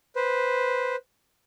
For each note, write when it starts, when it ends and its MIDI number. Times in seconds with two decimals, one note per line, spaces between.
0.16 0.96 71
0.16 0.96 72